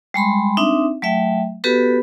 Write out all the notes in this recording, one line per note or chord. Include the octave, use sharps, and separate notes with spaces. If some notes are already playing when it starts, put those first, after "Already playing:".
G3 G#3 B5 C6
C4 D4 D#4 E5
F#3 A3 E5 G5
B3 F#4 G4 A4 B4 B5